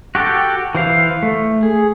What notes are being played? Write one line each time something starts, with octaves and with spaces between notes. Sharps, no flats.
F#4 G4 A4 G5
E3 C5 F5
A3
G#4